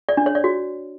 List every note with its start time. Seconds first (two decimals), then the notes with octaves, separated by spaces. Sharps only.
0.09 D5
0.17 D4
0.26 C#5
0.35 D5
0.44 F#4